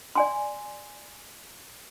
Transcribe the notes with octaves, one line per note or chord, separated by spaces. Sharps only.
D5 G#5 C6